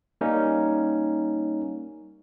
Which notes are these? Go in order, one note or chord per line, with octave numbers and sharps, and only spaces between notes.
G3 A#3 C#4 D#4